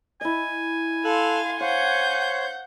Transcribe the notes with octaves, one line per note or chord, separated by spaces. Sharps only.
E4 D#5 G#5
A4 F5 C6 E6 F#6
C5 C#5 F5 F#5 G6